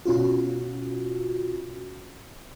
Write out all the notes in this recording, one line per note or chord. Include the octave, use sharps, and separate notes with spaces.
B2 C#4 F4 F#4